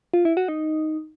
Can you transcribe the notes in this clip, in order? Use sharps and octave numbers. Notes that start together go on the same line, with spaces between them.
F4
E4
F#4
D#4